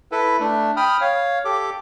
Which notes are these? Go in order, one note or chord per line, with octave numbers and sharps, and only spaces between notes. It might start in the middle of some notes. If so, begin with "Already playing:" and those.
E4 A4 B4
A3 D4
G5 B5 D#6 F6
C#5 F5
G4 A4 D6